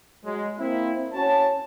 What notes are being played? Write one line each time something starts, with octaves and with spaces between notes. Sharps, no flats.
F#3 G#3
A#3 C4 E4
C#4 F#4 C#5 A5